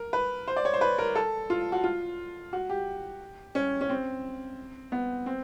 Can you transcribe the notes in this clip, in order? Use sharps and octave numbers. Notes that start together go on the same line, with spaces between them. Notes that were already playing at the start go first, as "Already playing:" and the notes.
Already playing: A#4
B4
C5
D5
C#5
C5
B4
A#4
A4
F4
F#4
F4
F#4
G4
C#4
C#4
C4
B3
C4